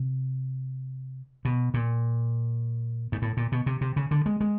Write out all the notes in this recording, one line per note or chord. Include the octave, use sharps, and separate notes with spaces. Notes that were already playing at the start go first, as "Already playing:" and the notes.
Already playing: C3
B2
A#2
G#2
A2
A#2
B2
C3
C3
C#3
D3
G#3
G#3